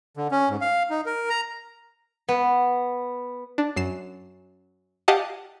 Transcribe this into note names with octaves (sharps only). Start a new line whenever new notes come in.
D3
C#4
G#2
F5
D#4
A#4
A#5
B3
D4
F#2 C7 E7
G4 D#5 F5 F#5 G#5 A5